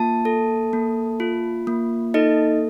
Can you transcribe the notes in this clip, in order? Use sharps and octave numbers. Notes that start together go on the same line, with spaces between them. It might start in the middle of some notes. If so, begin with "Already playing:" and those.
Already playing: A#3 F4 A5
A4
A#3
F4
A#3
D#4 A4 D#5